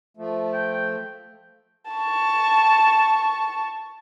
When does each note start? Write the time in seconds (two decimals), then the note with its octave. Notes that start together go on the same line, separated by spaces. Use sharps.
0.17 F3 A3
0.53 G5
1.92 A5 C#6